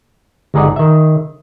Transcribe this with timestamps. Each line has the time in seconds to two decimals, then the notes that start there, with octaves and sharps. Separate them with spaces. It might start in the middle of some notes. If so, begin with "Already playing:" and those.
0.54 G1 G#3 D#4 G#4 D5 F#5
0.76 D#3 E5